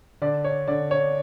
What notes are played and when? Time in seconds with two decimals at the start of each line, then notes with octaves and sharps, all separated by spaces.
0.22 D3 D5
0.44 C#5
0.67 D3 D5
0.91 C#5